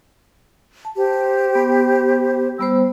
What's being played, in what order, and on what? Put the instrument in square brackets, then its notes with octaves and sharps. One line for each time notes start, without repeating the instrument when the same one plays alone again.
[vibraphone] A5
[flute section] G4 C5
[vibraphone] B3
[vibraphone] G3 B3 C5 [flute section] E6